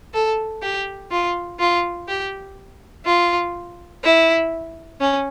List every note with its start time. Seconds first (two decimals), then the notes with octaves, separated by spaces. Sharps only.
0.14 A4
0.62 G4
1.11 F4
1.60 F4
2.08 G4
3.05 F4
4.04 E4
5.00 C#4